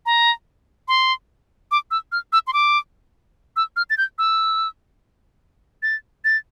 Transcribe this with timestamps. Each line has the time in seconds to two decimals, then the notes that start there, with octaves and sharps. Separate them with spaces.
0.06 A#5
0.88 C6
1.71 D6
1.91 E6
2.12 F6
2.33 E6
2.47 C6
2.53 D6
3.56 E6
3.76 F6
3.90 A6
3.98 G6
4.18 E6
5.83 A6
6.25 A6